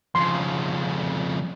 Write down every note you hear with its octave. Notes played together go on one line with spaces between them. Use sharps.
F2 C#3 C6